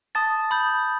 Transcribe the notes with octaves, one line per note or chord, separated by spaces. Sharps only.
A5 D#6 A6
B5 D#6 G6